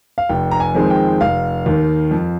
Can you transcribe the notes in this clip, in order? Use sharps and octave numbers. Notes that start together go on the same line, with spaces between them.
F5
F1 G5
A#5
G#5
F2 D#3 G#3 C4
G5
F1 F5
D#2 D#3
F2